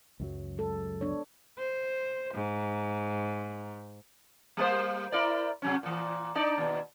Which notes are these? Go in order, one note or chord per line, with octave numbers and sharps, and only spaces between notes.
C#2 F#2 F#3
G#3 A4
B3 D4 C#5
C5
G#2
G3 A#3 C5
E4 A#4 D5
C3 F#3 C#4
A#2 E3
D4 D#4 D5
D#2 B2